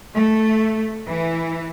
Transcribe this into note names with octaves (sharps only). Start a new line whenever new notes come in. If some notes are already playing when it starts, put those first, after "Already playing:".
A3
E3